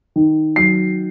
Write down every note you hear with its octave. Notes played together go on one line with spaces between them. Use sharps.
D#3
F#3 C7